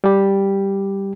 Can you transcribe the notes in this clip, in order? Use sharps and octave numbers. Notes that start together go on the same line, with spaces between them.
G3 G4